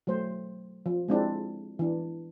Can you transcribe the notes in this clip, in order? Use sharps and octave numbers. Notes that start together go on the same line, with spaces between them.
F#3 A3 C5
F3
G#3 C4 D4 E4
E3 D4